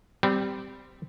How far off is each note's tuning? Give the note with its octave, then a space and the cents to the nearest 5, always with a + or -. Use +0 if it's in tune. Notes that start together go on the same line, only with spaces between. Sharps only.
G3 +0 C4 -20